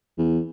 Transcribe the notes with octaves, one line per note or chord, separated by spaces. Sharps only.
E2